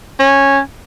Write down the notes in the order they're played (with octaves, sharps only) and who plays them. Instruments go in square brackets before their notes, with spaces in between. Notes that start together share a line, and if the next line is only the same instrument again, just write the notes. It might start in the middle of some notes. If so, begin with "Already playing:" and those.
[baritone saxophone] C#4